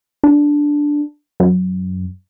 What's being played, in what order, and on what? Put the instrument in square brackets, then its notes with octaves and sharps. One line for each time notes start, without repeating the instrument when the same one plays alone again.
[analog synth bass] D4
F#2